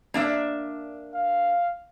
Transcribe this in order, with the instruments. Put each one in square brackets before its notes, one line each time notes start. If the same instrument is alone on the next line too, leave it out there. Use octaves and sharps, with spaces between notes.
[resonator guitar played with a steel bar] A#3 D4 E5
[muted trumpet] F5